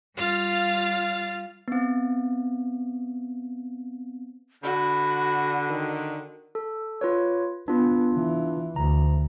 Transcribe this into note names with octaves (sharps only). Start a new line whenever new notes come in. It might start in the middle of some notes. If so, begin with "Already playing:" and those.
G3 F4 F5 F6 A6
B3 C4
D3 F#4 B5
D#3
A4
F4 B4 C#5
B3 D4 F4
E3
D2 A#5